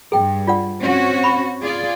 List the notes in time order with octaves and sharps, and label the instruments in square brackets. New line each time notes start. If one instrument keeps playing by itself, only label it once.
[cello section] G2 [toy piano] G#4 G5
[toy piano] F4 D5 F#5
[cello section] C4 C#4 F#4
[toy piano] B5 C#6
[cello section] F4 G#4 D5